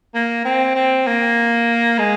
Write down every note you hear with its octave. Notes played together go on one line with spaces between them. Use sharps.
A#3
C4
C4
A#3
G#3